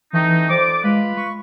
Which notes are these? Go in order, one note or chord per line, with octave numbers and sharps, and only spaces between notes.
E3 A3 C4 D#4
F2 C5 D5 D6
G#3 F4 B4
C#6